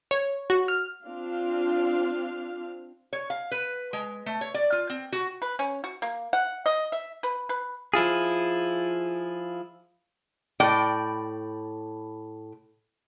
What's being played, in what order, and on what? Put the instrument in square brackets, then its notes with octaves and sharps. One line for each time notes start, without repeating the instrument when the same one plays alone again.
[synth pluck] C#5
F#4
F6
[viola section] C4 D4 F4 F5
[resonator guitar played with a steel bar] C#5
F5
B4
G#3
A3
C#5
D5
F4
C4
F#4
[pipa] B4
C#4
F#4
A#3
F#5
D#5
E5
B4
B4
[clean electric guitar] F3 E4 F4 G#4
[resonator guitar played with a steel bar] A2 D5 G5